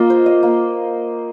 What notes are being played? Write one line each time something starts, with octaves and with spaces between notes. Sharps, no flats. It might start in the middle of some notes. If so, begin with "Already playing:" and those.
Already playing: A#3 F4 D#5
C5
D#5
A#3